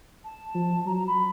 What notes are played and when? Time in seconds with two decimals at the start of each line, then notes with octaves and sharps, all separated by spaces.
0.24 A5
0.55 F3
0.86 F#3 A#5
0.96 A#5
1.07 B5